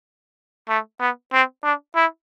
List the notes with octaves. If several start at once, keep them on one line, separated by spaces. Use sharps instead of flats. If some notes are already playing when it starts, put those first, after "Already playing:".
A3
B3
C4
D4
E4